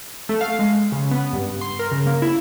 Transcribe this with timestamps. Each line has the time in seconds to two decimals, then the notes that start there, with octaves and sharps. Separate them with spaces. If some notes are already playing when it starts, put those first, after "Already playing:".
0.29 A3
0.41 F5
0.59 G#3
0.92 C#3
1.11 B3
1.33 G2
1.61 C6
1.79 A#4
1.91 C#3
2.06 A#3
2.22 E4